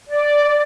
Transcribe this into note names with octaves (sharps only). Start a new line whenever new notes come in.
D5